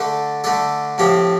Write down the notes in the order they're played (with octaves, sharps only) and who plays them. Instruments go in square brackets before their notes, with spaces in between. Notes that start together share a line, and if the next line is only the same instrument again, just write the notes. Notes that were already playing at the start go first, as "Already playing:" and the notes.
Already playing: [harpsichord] D3 A3 D4 A4
D3 A3 D4 A4
A2 F3 C4 G4